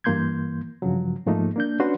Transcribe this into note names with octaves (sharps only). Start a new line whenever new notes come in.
G2 E3 A#3 C6 G6 G#6
G2 C#3 F3 F#3
G#2 F3 A3 A#3 D#4
A#3 D4 G6
C#4 D4 F#4 B4 F#5 C6